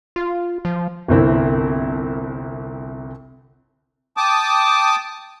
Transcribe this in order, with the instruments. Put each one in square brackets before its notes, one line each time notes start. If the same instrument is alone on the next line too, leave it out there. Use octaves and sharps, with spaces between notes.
[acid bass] F4
F3
[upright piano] G1 C2 C4 E4
[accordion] G5 A5 D6 D#6